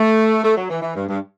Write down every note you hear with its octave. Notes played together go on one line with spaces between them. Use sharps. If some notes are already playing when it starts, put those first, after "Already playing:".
Already playing: A3
A3
F#3
E3
E3
G2
G2